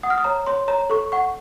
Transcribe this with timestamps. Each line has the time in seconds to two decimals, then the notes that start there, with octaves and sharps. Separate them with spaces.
0.03 F#5 D#6
0.10 F6
0.18 D#6
0.24 C#5 A#5
0.47 C#5 C6
0.68 C#5 A#5
0.90 A4 C#6
1.12 F#5 C#6